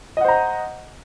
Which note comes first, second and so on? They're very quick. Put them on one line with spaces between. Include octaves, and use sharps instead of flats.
D#5 F#5 C5 A#5